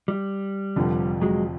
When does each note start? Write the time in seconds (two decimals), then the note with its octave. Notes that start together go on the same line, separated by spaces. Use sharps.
0.08 G3
0.76 F1 F2 D3 F3
1.22 F#3 G#3